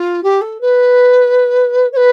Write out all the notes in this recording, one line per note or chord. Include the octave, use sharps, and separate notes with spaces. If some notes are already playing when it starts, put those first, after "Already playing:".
Already playing: F4
G4
A4
B4
C#5
B4